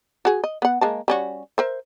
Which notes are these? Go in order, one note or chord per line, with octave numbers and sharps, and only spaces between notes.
F#4 G#4
D#5
B3 F#5
G#3 A#3 A5
G3 C#4 F#4
A#4 C5 E5